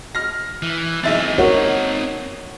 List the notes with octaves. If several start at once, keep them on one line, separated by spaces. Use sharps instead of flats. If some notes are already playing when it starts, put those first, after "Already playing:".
F6 A#6
E3
B1 C4 D#4 E5 A6
F#4 A#4 C#5